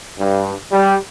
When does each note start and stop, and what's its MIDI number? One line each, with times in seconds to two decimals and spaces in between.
0.19 0.53 43
0.71 0.95 55